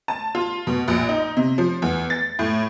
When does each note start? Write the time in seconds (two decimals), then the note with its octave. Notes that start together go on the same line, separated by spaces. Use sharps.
0.08 A5
0.35 F4
0.67 B2
0.88 A#1
1.09 D#4
1.37 C3
1.58 F3
1.82 E2
2.10 A6
2.39 A2